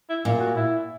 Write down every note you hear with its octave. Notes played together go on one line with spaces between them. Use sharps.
E4
A#2
F#4
E4